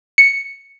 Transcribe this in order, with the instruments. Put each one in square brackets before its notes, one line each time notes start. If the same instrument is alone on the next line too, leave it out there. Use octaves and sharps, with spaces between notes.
[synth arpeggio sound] C#7